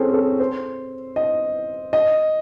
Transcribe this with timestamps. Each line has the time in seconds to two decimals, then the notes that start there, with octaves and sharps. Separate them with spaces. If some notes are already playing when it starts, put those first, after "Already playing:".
Already playing: C4 C#4 G#4 A4
0.14 A4
0.39 C5
1.16 D#5
1.93 D#5